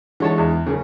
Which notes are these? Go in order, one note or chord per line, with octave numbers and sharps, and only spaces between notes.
D3 E3 G#3 C#5 A5
E2
F#1 C#3